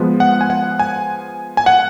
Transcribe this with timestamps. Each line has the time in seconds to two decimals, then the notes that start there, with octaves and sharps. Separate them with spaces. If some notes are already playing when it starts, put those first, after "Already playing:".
Already playing: F3 G#3 B3
0.20 F#5
0.41 G#5
0.50 F#5
0.79 G#5
1.57 G#5
1.66 F#5